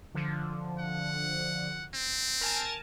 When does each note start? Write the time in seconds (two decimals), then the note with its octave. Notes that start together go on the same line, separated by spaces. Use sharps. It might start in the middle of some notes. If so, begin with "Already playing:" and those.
0.15 D3 F3
0.79 F#5
1.94 C4
2.41 A#4 G#5 A5